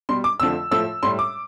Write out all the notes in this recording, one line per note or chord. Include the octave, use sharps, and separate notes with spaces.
B2 G3 C6
D6
F2 D3 F3 A3 E6
A2 F3 A3 E6
A2 G3 C6
D6